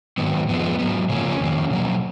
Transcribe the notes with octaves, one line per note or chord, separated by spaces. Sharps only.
G#2 D#3 F#3 B3
F2 F3 G#3 B3
G#2 F#3 B3
C#3 F3 A#3 C#4
F2 D#3 A#3
B2 F#3 A#3